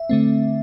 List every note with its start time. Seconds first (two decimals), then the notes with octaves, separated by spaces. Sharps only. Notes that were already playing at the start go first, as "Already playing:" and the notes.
Already playing: E5
0.09 D3 A3 C4